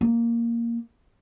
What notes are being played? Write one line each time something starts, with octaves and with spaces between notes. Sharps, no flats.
A#3